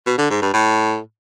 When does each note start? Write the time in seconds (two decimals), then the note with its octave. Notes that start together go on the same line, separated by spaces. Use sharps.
0.07 B2
0.18 D3
0.30 G#2
0.42 G2
0.54 A2